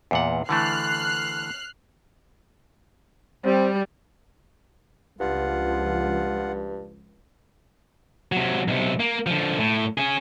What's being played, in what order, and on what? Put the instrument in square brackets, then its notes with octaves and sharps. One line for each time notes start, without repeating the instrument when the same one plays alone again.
[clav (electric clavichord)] E2 A#2 F#5
[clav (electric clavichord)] D3 E3 A3 [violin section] F6 F#6 C7
[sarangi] G3 [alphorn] C4
[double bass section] C#2 F3 [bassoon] G2 [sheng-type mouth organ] F4 F#5
[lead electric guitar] C3 F#3
B1 C3
A#3
D3 F3
A2
C#4 G#4